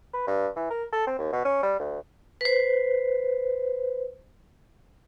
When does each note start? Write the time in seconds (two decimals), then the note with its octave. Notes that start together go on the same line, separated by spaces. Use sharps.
0.14 B4
0.27 G2
0.56 E3
0.71 A#4
0.92 A4
1.07 C4
1.18 D#2
1.33 B2
1.45 C#4
1.63 G3
1.80 D2
2.41 B4 C5